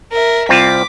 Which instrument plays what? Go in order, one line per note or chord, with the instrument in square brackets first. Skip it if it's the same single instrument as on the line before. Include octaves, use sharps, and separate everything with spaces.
[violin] A#4 E5
[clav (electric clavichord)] C2 C4 F4 [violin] D6 B6